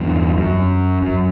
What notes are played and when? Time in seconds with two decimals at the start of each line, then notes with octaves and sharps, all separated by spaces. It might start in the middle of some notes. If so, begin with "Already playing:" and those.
Already playing: E2 G2
0.38 F#2
1.02 F#2